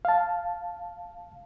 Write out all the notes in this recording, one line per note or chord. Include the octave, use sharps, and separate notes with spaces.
F5 A5